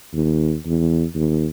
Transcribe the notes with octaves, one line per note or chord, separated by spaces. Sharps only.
D#2
E2
D#2